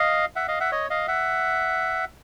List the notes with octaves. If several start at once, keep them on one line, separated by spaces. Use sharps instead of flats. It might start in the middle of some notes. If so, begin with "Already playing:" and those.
Already playing: D#5 F5
E5 F#5
D#5 F5
E5 F#5
C#5 D#5
D#5 F5
E5 F#5